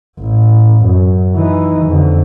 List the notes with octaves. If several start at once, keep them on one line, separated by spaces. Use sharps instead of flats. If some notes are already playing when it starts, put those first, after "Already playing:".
A1
F#2
E3 D#4
F2 D3